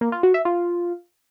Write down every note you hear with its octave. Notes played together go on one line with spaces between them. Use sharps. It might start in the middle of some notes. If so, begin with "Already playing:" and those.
A#3
F4
F#4
E5
F4